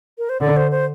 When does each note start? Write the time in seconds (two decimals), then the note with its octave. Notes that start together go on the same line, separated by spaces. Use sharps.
0.18 A#4
0.29 C5
0.41 D3 D5
0.56 C5
0.71 C5